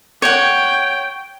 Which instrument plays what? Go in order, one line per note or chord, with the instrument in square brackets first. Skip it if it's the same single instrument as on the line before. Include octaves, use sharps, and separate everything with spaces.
[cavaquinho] C#5 F#5 [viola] G5